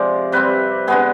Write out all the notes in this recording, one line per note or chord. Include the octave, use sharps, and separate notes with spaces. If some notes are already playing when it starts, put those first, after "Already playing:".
Already playing: C3 F3 G#3 D5
C3 G3 C4 B4
D3 G#3 B3 G#4